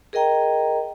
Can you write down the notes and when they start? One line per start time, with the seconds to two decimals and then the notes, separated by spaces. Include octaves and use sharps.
0.13 G#4 A#4 D#5 G5 A#5